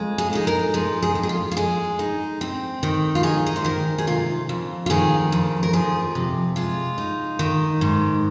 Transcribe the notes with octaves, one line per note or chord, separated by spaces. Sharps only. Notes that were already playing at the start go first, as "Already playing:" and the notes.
Already playing: F2 G#3
G#4
D#4 G#4
A#4
F3 G#4
G#4
F2
G#4
F4
F4
G#3 G#4
D#4
C4
D#3
F4
D#4 G#4
D#5
C5
D#3 A#4
G#4
C3 F4
F2
F4
D#3 G#4
F2
A#4
F3 G#4
C3
G#3 F4
D#4
D#3
G#2